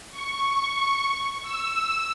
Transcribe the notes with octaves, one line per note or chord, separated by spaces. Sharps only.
C#6
E6